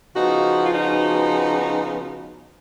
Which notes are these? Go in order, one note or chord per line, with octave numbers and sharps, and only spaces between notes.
C#3 F3 B3 D#4 F#4
F4
D#4 F#4